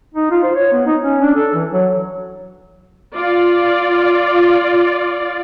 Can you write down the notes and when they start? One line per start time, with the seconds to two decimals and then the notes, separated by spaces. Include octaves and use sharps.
0.15 D#4
0.31 F4
0.43 C5
0.55 C#5
0.72 B3
0.87 D#4
1.02 C#4
1.22 D4
1.36 A4
1.54 E3
1.73 F#3
3.14 F4 D5